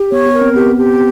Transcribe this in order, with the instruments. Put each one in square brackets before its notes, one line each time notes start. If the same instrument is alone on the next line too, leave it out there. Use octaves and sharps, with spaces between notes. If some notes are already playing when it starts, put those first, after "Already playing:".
Already playing: [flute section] G4
[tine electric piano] B3 [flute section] C#5
[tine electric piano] B3
[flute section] A#4
[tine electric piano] C4
[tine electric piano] B3 [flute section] G4
[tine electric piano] B3
[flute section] G4